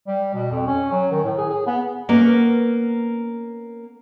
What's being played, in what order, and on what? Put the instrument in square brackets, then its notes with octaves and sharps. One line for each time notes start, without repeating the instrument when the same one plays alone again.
[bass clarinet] G3
B2
F2
C#4
F#3
D#3
A2
G#4
G#4
B3
[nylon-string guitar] A#3 B3 C#4 A#4